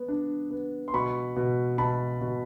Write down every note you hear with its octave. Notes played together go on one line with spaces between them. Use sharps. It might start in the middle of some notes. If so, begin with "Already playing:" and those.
Already playing: B3
D4
B3
C6
B2 B5 C#6
B2
B2 A5 B5
B2